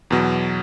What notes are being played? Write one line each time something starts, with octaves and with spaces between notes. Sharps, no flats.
E2 B2 F#3